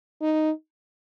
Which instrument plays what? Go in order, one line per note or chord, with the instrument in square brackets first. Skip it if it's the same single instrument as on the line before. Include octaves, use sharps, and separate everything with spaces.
[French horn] D#4